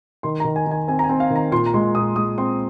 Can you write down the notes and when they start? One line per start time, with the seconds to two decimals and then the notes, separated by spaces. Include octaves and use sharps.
0.23 D#3 C6
0.40 A#5
0.45 D#3
0.56 G#5
0.66 D#3 G#5
0.88 C4 G#5
0.99 A#5
1.04 G#5
1.09 C4
1.20 F5
1.30 D#3
1.36 A#5
1.52 A#2 C6
1.66 A#5
1.74 G#3 C6
1.95 A#2 D#6
2.16 G#3 D#6
2.38 C4 C6